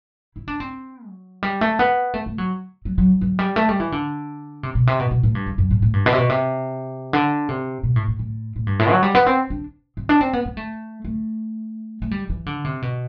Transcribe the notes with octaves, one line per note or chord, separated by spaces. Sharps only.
E4
D4
C4
F#3
G3
A3
B3
A3
A3
F#3
F#3
F#3
F#3
G3
A3
G3
E3
D3
C3
B2
C3
B2
B2
A2
G2
E2
F#2
A2
A2
G2
B2
C3
B2
C3
D3
C3
B2
A2
A2
A2
A2
G2
A2
F#3
G3
B3
C4
D4
C4
D4
C4
B3
B3
A3
A3
A3
G3
E3
D3
C3
B2